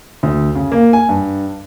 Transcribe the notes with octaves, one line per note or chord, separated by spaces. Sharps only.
D2
C#3
A#3
G#5
G2